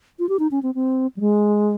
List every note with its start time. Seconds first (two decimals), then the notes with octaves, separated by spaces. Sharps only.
0.19 F4
0.29 G4
0.39 D#4
0.51 C#4
0.63 C4
0.75 C4
1.17 G3
1.20 G#3